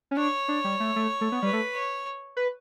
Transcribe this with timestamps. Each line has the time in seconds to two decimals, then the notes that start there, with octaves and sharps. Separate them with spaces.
0.11 C#4
0.17 D4 C#5
0.48 D4
0.64 G3
0.80 A3
0.96 A3
1.21 A3
1.32 B3
1.43 G3 B4
1.53 A3
1.74 C#5
2.37 B4